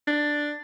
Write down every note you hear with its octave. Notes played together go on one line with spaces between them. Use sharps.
D4